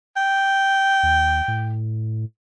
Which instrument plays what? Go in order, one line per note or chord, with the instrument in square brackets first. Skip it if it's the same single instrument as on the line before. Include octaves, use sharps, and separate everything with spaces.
[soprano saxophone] G5
[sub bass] D#2
A2